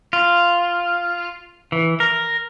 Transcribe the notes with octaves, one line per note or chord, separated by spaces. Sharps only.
F4
E3
A#4